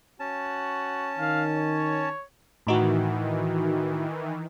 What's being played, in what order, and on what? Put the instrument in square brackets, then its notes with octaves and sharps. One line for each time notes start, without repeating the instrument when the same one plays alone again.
[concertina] C#4 A5 [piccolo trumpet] F#4
[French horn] D#3 [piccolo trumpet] F5
[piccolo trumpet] C#5
[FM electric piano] A2 D#4 F#4 [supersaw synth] D#3 E3